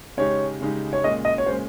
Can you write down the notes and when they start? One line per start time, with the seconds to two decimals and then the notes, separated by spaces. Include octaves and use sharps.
0.17 C#3 G#3 D#4 G4 C#5
0.61 C#3 G#3 D#4 G4
0.93 C#5
1.03 A#2 G#3 C#4 D#5
1.25 D#5
1.38 C#5
1.46 A#2 G#3 C#4 C5